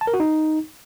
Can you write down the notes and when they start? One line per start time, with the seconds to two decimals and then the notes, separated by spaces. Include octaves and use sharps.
0.01 A5
0.07 A#4
0.14 F#4
0.20 D#4